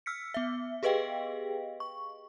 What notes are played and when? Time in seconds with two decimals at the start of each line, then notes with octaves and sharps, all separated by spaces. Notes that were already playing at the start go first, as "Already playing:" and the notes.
0.06 E6 F6 B6 C#7
0.34 B3 E5
0.83 G4 G#4 B4 D#5 F5 G5
1.80 C#6